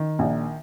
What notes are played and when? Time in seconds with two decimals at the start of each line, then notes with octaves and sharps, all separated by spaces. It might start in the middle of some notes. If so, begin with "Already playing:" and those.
Already playing: D#3
0.19 A#1